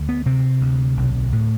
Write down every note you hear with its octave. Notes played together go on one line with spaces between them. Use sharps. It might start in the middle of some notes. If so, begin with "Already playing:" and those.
Already playing: D2
B3
C3 C4
D2
B1
A2